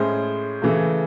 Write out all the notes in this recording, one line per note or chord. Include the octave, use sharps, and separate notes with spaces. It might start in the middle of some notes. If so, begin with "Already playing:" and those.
Already playing: A2 G#3 C#4 G#4 C5
C#3 E3 A3